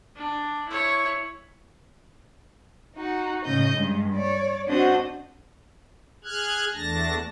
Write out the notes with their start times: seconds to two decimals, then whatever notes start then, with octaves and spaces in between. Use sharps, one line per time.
0.16 D4
0.68 E4 C#5
2.95 D#4 F#4
3.45 A2 C#3 D#5 G6
3.76 G2 G#3
4.15 C#5 D5
4.68 C4 D4 F#4 C5 D#5 F#5
6.24 G#4 F6 F#6 G#6
6.74 E2 A3 D4 A5 A#6